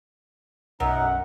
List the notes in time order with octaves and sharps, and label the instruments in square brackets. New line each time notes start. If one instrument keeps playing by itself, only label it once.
[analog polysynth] B1 [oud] F#2 [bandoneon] D#4 [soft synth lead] F#5